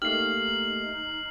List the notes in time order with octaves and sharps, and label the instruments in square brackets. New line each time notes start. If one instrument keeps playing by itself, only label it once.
[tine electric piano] A3 A#3 G4 [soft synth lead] D#4 [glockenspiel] F6 [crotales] C7 F#7